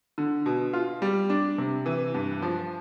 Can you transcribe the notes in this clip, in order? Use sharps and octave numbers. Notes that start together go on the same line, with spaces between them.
D3
B2
F4
G3
D4
C3
E3
G2
F3